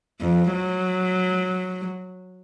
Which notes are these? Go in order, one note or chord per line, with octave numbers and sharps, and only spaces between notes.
F2
F#3